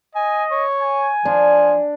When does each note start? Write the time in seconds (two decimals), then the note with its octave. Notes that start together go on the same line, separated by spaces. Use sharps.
0.15 D#5 G#5
0.51 C#5
0.80 G#5
1.25 F3 D4